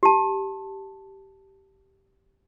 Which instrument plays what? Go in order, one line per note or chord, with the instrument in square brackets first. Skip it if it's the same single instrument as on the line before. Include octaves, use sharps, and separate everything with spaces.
[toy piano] G4 A5